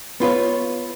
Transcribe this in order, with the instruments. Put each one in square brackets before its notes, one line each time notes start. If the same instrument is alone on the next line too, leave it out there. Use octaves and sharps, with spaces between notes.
[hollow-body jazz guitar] B3 F4 B4 C#5